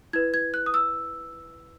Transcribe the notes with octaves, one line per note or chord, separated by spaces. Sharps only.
E4 B4 G#6
G#6
F#6
D#6
E6